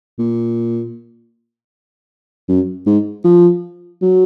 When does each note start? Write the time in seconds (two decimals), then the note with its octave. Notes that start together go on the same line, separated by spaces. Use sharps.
0.19 A#2
2.48 F#2
2.86 G#2
3.24 F3
4.02 F#3